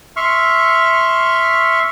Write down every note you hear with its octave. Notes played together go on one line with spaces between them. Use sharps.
E5 C6 C#6 F6